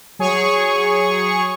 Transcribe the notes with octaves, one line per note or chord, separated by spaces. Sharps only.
F#3 G#4 C#5 C#6